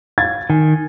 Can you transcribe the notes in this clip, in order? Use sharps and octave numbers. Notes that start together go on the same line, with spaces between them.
F5 G#6 A6
D#3 G#5